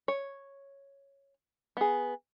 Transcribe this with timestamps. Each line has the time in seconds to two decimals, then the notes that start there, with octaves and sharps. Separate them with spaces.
0.08 C#5
1.77 B3 G#4